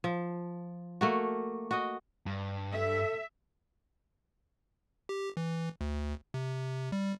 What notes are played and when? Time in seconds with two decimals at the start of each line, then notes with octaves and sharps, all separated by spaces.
0.04 F3
1.01 A3 A#3 F#4
1.71 F#4 D#5
2.26 G2
2.72 A4 E5
5.09 G4
5.37 E3
5.81 D2
6.34 C3
6.92 G3